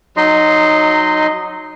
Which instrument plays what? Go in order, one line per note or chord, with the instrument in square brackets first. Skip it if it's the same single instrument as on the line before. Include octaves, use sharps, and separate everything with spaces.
[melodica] F#3 D#4 D#5 C6